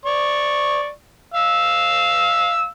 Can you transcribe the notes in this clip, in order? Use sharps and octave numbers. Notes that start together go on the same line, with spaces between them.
D5 C#6
F5 E6